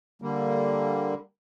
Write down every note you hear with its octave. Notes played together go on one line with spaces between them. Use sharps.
D3 G3 A#3